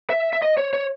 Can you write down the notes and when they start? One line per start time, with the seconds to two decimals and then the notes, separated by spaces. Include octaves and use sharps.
0.10 E5
0.33 E5
0.42 D#5
0.57 C#5
0.73 C#5